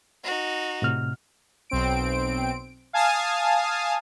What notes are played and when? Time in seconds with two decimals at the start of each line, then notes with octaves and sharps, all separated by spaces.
0.24 D#4 F#4
0.82 A2 C3 F6
1.70 B1 C4 D7
2.93 F5 G#5 A5 D#6